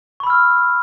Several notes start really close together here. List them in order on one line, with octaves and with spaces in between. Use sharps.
C#6 B5 E6 F6